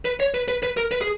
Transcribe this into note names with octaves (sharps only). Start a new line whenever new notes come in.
B4
C#5
B4
B4
B4
A#4
B4
G#4